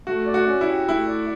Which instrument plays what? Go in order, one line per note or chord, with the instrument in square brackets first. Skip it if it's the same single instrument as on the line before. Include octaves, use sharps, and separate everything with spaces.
[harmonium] A3 [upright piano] F#4
[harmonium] D5
[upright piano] F#4
[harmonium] C#4
[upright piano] E4
[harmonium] G4
[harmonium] A3 [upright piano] E4
[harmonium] D5